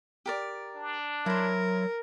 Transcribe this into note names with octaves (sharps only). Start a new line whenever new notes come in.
G4 A#4 D5
D4
F#3 E4 A#4 C5